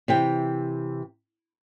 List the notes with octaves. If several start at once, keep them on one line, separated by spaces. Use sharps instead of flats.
C3 E3 G5